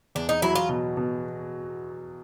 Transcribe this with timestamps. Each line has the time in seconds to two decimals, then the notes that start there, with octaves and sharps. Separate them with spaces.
0.15 E2 D4
0.29 D#4
0.42 F#3 E4
0.55 F4
0.69 B2
0.97 B2